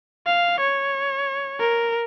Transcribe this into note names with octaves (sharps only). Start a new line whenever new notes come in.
F5
C#5
A#4